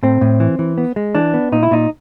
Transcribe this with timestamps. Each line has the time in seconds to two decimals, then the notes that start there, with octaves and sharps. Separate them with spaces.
0.03 A2 C4
0.21 A2
0.40 E3
0.59 E3
0.78 B3
0.96 G#3
1.15 E3 D4
1.34 B3
1.52 A#2 D#4
1.63 E4
1.71 A#2 D#4